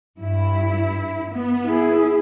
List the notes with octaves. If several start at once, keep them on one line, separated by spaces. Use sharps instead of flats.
G2 E4
B3
E4 G#4